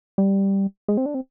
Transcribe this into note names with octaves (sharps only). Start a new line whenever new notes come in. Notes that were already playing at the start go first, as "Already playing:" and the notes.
G3
G#3
C4
D4
C4